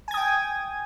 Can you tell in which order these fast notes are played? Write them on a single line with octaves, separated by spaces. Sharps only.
G#5 G#6 D#6 G5